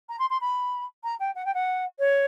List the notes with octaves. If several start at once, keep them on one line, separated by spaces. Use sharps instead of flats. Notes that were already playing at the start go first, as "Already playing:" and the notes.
A#5
C6
C6
B5
A#5
G5
F#5
G5
F#5
C#5